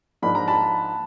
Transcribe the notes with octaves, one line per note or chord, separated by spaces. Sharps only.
G#2 F3 A#3 D4 B5
A#5
A5 B5